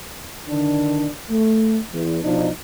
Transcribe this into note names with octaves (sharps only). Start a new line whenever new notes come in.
D3 D#3 D4
A3
E2
B2 F3 D4 D#4